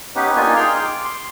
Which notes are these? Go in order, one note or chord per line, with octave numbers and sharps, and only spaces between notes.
B3 C#4 D#4 G4 B4
A#3 D4 D#4 F4 G#5
G#4 G5 C6 F6
D6
C6